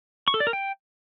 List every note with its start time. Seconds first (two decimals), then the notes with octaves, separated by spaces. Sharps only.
0.28 C#6
0.34 A4
0.40 D5
0.47 A#4
0.53 G5